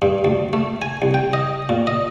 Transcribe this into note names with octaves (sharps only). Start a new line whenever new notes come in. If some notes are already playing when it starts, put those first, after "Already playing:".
G2
D2
A3
G#5
C2
G5
D#5
A#2
D#5